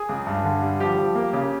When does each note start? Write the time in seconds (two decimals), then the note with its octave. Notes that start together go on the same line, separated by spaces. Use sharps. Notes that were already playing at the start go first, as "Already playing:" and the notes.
Already playing: G#4
0.09 C#2
0.27 G2
0.44 D3
0.62 G3
0.80 F3 G4
0.97 F3
1.15 A#3
1.33 C#3